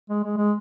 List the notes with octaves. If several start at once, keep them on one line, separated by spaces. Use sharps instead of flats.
G#3
G#3
G#3